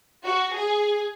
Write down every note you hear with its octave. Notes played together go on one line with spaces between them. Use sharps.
F#4
G#4